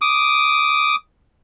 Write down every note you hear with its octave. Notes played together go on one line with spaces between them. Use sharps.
D6 D#6